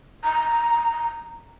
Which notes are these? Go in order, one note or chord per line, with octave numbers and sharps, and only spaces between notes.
A#5